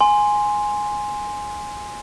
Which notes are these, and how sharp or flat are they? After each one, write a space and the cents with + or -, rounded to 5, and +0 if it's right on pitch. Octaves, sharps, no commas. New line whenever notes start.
G#5 +0 C6 +0